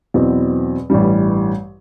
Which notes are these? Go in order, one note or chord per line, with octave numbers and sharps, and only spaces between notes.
E2 B2 F#3 C4
A1 G2 E3 G3